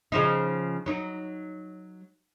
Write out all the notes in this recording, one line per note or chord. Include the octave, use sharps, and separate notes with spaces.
C#3 F3 D#4
F#3 D#4